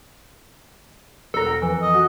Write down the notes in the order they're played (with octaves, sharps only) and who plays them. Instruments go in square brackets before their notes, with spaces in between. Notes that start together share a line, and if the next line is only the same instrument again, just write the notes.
[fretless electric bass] E1 [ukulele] D4 A#4 [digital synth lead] A4
[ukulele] G5
[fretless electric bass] F2 [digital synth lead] E3
[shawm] D#5
[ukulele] F#4